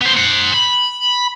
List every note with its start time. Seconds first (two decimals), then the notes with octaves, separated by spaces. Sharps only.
0.01 B3 C5
0.17 C5 F#5
0.54 B5